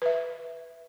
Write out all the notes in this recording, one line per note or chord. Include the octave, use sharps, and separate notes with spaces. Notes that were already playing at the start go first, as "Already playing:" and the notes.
B4 E5